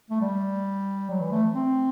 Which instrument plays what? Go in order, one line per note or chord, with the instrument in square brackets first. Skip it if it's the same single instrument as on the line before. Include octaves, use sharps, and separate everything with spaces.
[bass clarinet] A3
G3
F#3
E3
A3
C4